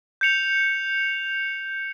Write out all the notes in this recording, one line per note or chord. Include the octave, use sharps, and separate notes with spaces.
G6 C#7 F7